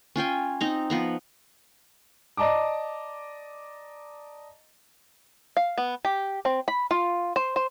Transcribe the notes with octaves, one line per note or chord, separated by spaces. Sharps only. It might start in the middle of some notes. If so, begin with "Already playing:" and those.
C#4 F4 G5 G#5
C4 D#4 A#5
F3 B3 A#5
D5 D#5 A5 A#5 D6
F5
B3
G4
C4
B5
F4
C5
C5